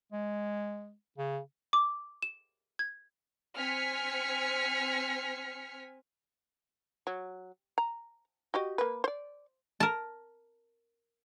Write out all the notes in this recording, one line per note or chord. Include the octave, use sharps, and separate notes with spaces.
G#3
C#3
D6
E7
G#6
C4 G#5 F6 B6 C#7
F#3
A#5
F#4 G4 D#5
A#3 B4
C5 D5
A#4 A5